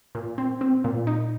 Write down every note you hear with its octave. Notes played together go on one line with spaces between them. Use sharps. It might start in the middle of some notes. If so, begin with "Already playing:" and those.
A#2
C4
C4
A#2
D#4